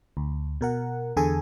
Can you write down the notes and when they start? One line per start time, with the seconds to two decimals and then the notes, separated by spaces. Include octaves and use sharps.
0.17 D2
0.61 B2 A#4 F#5
1.17 E2 D3 G#4 A4 G#5